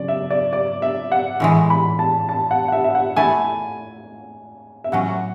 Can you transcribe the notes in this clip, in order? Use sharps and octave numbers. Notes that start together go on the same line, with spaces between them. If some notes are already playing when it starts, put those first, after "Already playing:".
Already playing: C#3 F#3 D5
E5
D5
D5
E5
F#5
A2 E3 G#3
B5
A5
A5
F#5
F#5
E5
E5
F#5
A3 E4 A4 G#5
E5
A2 F#3 C#4 F#5